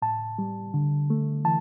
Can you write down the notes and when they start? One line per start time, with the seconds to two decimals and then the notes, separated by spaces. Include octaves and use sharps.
0.02 A2 A5
0.38 G3
0.74 D3
1.10 A3
1.45 E3 A5